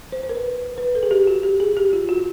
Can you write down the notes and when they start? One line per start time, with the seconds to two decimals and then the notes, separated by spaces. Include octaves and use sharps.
0.12 C5
0.23 C5
0.29 A#4
0.35 B4
0.78 B4
0.95 A4
1.03 G#4
1.11 G4
1.27 F#4
1.43 G4
1.60 G#4
1.77 G4
1.93 F4
2.09 F#4